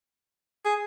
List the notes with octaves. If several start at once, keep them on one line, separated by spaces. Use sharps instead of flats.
G#4